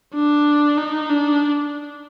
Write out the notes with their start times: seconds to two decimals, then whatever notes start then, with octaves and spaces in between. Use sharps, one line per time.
0.14 D4
0.78 D#4
1.10 D4